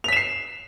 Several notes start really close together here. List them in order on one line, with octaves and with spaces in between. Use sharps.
F7 B6 E7 C7